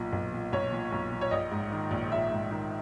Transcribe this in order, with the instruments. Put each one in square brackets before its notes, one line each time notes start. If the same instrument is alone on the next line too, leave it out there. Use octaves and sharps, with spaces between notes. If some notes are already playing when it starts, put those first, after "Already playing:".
Already playing: [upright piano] B1 A#2
B1
A#2
B1 C#5
A#2
B1
A#2
C#5
A#1 D#5
G#2
D#3
A#1
A#1 E5
G#2
D#3